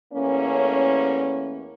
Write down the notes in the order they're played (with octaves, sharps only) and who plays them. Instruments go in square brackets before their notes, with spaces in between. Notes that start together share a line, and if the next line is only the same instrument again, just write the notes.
[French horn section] E2 A2 A#3 C#4